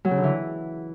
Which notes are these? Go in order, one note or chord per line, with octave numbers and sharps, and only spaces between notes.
F#3
C#3
D3
E3